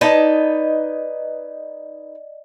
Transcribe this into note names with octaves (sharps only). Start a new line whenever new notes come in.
D#4 B4 D5 D#5 A5